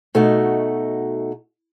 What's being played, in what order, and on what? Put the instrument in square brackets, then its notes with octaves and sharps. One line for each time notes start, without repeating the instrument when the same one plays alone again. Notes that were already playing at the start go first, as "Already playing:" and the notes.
[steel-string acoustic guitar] B2 A3 D#4 F#4